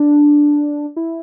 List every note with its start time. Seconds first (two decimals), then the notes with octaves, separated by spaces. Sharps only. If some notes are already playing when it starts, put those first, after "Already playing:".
Already playing: D4
0.96 E4